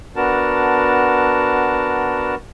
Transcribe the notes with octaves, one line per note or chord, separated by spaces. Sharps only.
B3 D4 F#4 A#4 A5